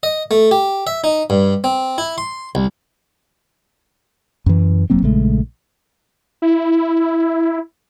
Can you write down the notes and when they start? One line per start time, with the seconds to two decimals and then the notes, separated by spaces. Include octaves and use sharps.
0.03 D#5
0.31 A3
0.51 G4
0.87 E5
1.04 D#4
1.30 G2
1.64 C4
1.98 E4
2.18 C6
2.55 C2
4.46 F#2 E3
4.90 E1 F#3 A#3 C4
5.03 A#1 C#3 G#3 A3
6.42 E4